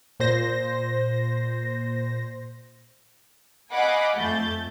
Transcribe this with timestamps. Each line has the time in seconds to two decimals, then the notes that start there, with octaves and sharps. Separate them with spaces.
0.20 A#2 C5 A#6
3.73 D#5 F5 F#5 G#5 B5 D6
4.17 F2 A3 G6 A6